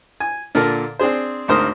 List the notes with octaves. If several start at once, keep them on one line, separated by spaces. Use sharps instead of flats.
G#5
A#2 D3 A4 A#4
C4 D4 G#4 C5
G#1 D2 G#2 A#4 C5 D#6